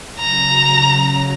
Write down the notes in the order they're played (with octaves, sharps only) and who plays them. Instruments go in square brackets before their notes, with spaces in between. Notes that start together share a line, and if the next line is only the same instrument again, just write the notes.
[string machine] C#3 F#3 [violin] A#5